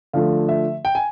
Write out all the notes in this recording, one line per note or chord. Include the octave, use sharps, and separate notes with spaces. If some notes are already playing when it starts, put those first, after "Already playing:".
D3 F3 A3 F5
E5
G5
G#5